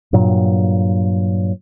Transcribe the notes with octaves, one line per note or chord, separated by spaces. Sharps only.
G2 A#2 F#3